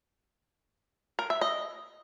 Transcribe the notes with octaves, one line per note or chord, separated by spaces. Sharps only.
A#4
E5
D#5